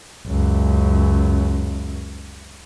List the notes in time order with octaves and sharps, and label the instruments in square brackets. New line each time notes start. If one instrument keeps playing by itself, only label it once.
[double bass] C#2 F#2